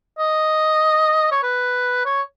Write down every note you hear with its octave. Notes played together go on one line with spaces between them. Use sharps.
D#5
C#5
B4
C#5